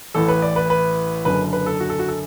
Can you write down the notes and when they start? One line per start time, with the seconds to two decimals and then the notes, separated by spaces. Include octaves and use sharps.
0.14 A1 A2 E3 A4
0.28 B4
0.42 D5
0.56 B4
0.70 B4
1.25 F#1 F#2 D3 B4
1.53 B4
1.66 A4
1.80 F#4
1.90 A4
1.99 F#4
2.08 A4